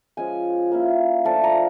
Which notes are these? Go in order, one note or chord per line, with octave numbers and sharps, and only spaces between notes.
F3 G#3 C#4 G#5
A#3 C#4 E4
F3 A3 D4 F4 A5
A#5